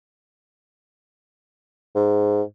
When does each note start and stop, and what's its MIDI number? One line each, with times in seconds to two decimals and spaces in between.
1.95 2.42 44